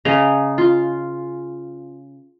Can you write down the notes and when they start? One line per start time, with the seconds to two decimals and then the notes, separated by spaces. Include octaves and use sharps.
0.05 C#3 D#5 A#5
0.58 F4